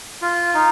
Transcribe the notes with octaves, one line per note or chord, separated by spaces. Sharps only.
F4
D#4